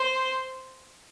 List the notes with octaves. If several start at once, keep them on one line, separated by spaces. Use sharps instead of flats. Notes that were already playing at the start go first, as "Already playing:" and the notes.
Already playing: C5